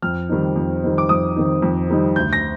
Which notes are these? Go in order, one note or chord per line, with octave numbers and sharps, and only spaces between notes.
F2 F6
D#3 G3 C4 D#4
F2
D#3 G3 C4 D#4
D6
F2 D#6
D#3 G3 C4 D#4
F2
D#3 G3 C4 D#4
D2 G6
A#6